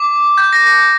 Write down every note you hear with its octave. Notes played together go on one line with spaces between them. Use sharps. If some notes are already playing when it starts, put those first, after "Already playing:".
Already playing: D6
G6
A#6
A#6